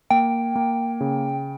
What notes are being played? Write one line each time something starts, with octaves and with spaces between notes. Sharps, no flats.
A#3 G5
A#3
C#3